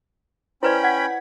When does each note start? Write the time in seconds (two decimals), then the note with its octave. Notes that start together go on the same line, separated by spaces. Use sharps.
0.63 C#4 E4 B4 C5 D5 G5 B5
0.84 F#5 G#6 B6